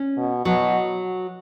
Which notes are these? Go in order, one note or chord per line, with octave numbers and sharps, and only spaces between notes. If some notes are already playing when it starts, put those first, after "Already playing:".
Already playing: C#4
B2
B2 F#3